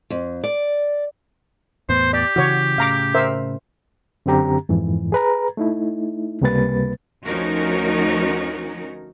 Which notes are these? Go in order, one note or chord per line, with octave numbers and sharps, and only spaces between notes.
F2
D5
E2 A2 B3 C5
G4 D5
C#3 E3 F#4 C#5
A2 C#3 F5 A#5 D6
A#4 C5 E5
F#2 D3 C4 G4 A#5
F2 G#2 E3
G#4 B4 A#5
A3 D#4 E4
C#2 C3 G3 A#3 B4 A6
D2 F3 C#4 D#4 F#4 A#4